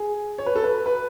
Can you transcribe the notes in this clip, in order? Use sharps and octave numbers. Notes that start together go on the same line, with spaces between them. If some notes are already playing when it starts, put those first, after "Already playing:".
Already playing: G#4
C#5
B4
A4
B4
B4